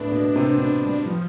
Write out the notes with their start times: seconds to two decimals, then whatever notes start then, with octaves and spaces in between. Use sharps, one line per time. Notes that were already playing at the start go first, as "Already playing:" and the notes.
Already playing: D2 A2 A3 B3 D4
0.12 B2 B3
0.35 C3 C4
0.51 C4
0.58 B2 B3
0.83 G2 G3
1.06 F3 G3